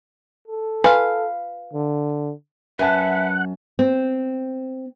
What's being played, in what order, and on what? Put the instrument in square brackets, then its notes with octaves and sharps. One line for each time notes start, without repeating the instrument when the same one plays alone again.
[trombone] A4
[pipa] F4 F5 [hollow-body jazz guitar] B4 [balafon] G#5
[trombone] D3
[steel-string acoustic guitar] F#2 [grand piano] B4 G#5 A5 [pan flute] E5 [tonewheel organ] F#5
[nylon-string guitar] C4